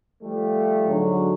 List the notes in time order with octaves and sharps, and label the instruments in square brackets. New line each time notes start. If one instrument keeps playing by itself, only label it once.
[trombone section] F3 G3 A3
[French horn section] G#2 D3 F#3